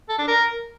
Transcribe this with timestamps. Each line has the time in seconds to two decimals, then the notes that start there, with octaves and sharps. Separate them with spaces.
0.09 A4
0.19 D4
0.28 A#4